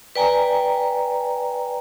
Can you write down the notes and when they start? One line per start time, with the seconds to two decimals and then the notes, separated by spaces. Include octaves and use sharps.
0.15 B4 D5 G5 G#5 A#5